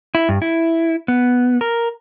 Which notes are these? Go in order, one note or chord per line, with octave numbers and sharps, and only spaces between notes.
E4
G2
E4
B3
A#4